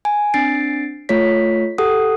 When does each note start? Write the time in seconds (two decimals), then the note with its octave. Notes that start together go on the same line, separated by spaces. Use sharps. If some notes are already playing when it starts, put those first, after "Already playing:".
0.05 G#5
0.34 C4 D4 A6 C7 D7
1.09 A3 F4 C#5 B6
1.78 G4 A4 F#5 D#6